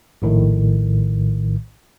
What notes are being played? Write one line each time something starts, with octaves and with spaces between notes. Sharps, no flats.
A#1 A2 D#3